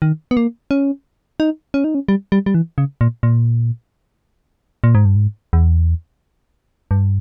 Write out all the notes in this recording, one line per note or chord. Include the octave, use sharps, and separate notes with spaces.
D#3
B3
A#3
C#4
D#4
C#4
D#4
C#4
G3
G3
G3
E3
C#3
A#2
A#2
A#2
G#2
G2
G#2
E2
G2